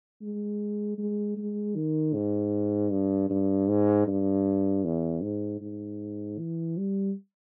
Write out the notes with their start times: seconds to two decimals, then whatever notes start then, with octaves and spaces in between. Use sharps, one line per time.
0.22 G#3
0.98 G#3
1.37 G#3
1.76 D#3
2.14 G#2
2.91 G2
3.30 G2
3.69 G#2
4.07 G2
4.85 E2
5.23 G#2
5.61 G#2
6.38 E3
6.77 G3